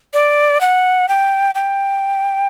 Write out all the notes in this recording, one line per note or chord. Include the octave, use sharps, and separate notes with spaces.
D5
F#5
G5
G5